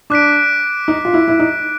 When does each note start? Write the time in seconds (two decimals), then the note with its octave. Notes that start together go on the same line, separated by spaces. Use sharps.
0.10 D4 D6 F#6 B6 D7
0.88 D#4
1.05 F4
1.14 E4
1.28 E4
1.40 D#4